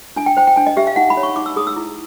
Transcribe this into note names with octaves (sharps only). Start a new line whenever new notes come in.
D4 G#5
G5
C5 G5
G5
D4 G#5
D#5
G4 E5
F5
D#4 F#5
B5
C#5
C#6
D#4 D6
E6
G#4 D#6
E6
E4